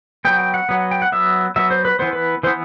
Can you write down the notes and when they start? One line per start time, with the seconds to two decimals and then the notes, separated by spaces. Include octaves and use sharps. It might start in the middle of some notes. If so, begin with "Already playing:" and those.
0.25 F#3 B3 G5
0.39 G5
0.54 F#5
0.69 F#3 B3
0.91 G5
1.02 F#5
1.12 F#3 B3 E5
1.56 F#3 B3 E5
1.71 C5
1.85 B4
1.99 E3 B3 C5
2.13 B4
2.43 E3 B3 C5